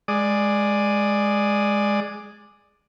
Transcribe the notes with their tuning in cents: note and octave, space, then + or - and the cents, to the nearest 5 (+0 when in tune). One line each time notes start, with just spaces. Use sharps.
G#3 +0 D5 +10 D#6 +0